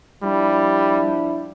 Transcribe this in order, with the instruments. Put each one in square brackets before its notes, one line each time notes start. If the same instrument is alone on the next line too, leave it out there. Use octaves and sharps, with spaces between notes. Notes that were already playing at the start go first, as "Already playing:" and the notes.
[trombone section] F3 D4 E4 [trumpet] G3